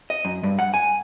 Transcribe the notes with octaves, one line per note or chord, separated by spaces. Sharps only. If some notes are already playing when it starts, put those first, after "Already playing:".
D#5
F#2
G2
F#5
G#5